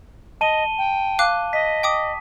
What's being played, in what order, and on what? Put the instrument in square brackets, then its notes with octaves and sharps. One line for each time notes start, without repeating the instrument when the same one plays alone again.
[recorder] D#5 [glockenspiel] A5 D#7 G7
[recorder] G5
[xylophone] F5 D6 F#6
[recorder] D#5 [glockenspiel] B6
[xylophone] G5 D6 D#6